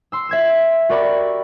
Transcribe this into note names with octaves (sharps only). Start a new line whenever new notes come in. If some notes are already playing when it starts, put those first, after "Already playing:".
C6 E6
E5 G#6 E7
F#4 G4 A#4 D5 B5 C#6